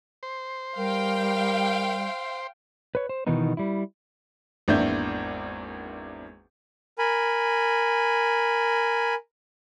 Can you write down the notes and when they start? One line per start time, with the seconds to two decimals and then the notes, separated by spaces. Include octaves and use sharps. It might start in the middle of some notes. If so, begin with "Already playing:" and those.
0.23 C5
0.77 G3 A#4 F5 G5
2.95 B4 C#5
3.09 C5
3.27 B2 D#3 E3 B3 D#4
3.57 G3 E4
4.68 G#1 E2 A#3 D4 E5 G6
6.98 A#4 G#5 B5